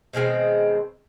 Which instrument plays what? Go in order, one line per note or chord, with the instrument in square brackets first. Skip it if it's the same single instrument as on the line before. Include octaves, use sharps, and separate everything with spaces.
[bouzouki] B2 D#3 G#3 C4